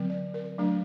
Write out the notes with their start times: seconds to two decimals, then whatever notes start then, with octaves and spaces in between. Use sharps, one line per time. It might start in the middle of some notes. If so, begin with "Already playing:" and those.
Already playing: D3 F#3 C4
0.10 D5
0.34 A#4
0.58 F#3 A3 D4